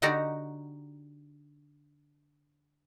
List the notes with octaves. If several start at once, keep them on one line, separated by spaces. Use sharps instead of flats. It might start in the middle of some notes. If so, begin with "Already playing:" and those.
D3 D#4 F#4 G4 D5 A#5